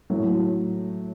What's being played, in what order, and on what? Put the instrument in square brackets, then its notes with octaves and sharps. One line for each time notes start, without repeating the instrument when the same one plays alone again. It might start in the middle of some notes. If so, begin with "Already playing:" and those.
[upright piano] A2 F#3 A3